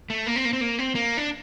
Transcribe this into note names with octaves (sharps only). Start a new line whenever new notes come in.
A3
A#3
C4
A#3
C4
A#3
C4
A#3
D4